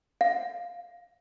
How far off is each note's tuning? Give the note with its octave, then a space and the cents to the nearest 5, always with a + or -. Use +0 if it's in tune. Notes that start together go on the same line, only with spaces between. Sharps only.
F5 +5